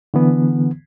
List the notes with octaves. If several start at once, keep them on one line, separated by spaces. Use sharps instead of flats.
D3 E3 B3